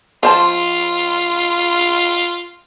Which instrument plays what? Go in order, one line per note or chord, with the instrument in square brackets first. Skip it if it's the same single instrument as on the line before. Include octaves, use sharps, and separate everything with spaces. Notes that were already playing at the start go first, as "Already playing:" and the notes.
[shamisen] F3 C5 A5 [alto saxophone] F4